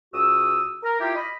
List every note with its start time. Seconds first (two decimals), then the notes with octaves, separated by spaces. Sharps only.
0.13 C#2 F#4 D#6 E6
0.83 A#4
1.00 E4 F4 G4
1.16 D#5 B5